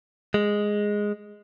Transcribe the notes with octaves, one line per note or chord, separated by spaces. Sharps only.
G#3